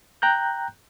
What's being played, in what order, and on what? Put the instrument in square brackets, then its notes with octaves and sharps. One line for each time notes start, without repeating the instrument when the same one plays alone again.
[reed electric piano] G5 A#5 F#6 G6